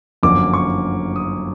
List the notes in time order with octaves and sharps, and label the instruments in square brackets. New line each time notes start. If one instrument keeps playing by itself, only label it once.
[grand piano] G1 F#2 D3 F3 A#3 D6
C#6
D#6